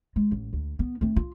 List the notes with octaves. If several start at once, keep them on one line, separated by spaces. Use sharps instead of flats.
G#3
A1
D2
B3
A3 C4
F4